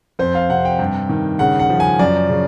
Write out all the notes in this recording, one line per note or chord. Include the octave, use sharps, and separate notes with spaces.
F2 C5
F5
C3 F#5
G5
G2
D#3
C#3 F#5
F#5
F3
G#5
F#2 D5
C#3